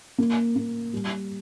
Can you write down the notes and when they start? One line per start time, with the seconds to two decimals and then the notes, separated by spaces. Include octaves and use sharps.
0.18 A#3
0.56 A#3
0.93 G3